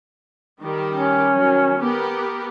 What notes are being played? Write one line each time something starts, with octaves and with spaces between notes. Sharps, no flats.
D#3 G3 G4
C#4
D#3 F#3
B3 G4 A#4